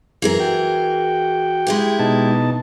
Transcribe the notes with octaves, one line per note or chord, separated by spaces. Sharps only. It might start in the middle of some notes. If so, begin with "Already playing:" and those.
F#2 E3 G#4 A#4
F#4 G5
G#3 E4 G4
B2 D#4 A5